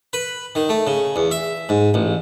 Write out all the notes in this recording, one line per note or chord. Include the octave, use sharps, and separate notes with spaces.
B4
D#3
A3
C#3
E2
E5
G#2
A1